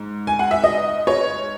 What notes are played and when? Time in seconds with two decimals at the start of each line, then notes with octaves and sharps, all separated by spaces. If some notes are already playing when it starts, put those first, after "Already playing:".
Already playing: G#2
0.27 G#5
0.39 F#5
0.51 E5
0.64 D#5
1.07 C#5